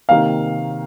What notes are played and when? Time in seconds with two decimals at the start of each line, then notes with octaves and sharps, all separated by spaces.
0.09 C3 D#3 A#3 F5